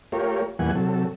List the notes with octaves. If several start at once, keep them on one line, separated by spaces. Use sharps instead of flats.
A3 F4 G4 A#4 C#5
E2 A#2 E3 G3 F#5 G#5
C3 F#3 A4